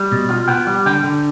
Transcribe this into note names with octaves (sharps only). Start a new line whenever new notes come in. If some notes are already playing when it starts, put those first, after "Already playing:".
Already playing: G3
B2
F4
B3 G5
G3
D3 G5
D3